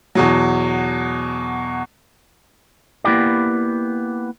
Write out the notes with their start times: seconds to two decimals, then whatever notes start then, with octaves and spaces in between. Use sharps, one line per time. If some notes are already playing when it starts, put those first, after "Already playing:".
0.15 E2 B2 F#3
3.04 A#3 B3 E4 G4 D5